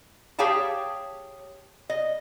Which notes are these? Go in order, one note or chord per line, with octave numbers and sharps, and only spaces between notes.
G4 G#4 C#5 F5 G5 A5
D#5